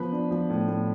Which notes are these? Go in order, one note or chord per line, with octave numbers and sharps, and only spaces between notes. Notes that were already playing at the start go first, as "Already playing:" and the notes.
Already playing: F3 B3 B4
D4
F3
A2
A2